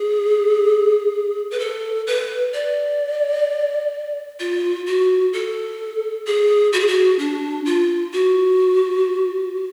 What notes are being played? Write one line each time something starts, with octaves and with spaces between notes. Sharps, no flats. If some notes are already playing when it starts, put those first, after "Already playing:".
Already playing: G#4
B4
A4
B4
D5
F4
F#4
A4
G#4
F#4
G#4
F#4
D4
F4
F#4